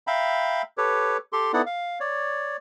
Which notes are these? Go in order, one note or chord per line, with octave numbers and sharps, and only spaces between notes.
E5 F5 G5 A#5 B5
G4 A4 B4 C#5
G4 A4 C6
B3 D#4 E4 A4 D5 F#5
F5
C#5 D5